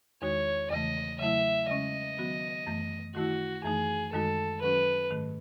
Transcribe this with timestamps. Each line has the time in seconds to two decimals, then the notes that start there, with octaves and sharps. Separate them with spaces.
0.22 E2 D#3 G#3 D#4 F#4 C#5
0.71 E2 C#3 E3 A3 D#5
1.19 C#3 F#3 A3 E4 E5
1.68 C#3 G#3 C#4 D#5
2.18 D#3 F#3 B3 F#4
2.66 F#2 E3 A3
3.15 D#3 A3 E4 F#4
3.64 F#2 E3 A3 D#4 G#4
4.13 F#2 D#3 G#3 D#4 F#4 A4
4.62 D#3 F#3 C#4 F#4 B4
5.11 G#2 D#3 A3